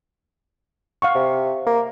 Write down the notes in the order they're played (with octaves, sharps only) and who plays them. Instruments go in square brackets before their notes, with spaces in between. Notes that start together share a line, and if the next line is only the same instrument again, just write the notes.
[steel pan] F5 F#5 C#6
[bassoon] C3
A#3